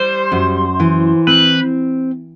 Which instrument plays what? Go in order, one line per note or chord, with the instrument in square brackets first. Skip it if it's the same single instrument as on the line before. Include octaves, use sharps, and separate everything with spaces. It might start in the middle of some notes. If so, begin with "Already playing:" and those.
Already playing: [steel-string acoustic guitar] G3 [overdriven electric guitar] C5
[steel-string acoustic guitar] F#2
E3
[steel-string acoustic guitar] C4 [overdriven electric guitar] B4